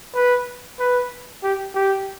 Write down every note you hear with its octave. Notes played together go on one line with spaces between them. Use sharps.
B4
B4
G4
G4